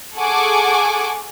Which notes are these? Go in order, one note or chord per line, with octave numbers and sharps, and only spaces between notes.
G#4 A4 F#5 G#5 C#6 D6